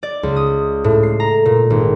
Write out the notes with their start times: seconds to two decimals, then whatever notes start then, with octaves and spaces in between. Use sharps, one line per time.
0.03 D5
0.23 C#2
0.36 D#6
0.84 A2
1.03 C7
1.20 A#5
1.45 A#2
1.70 G#1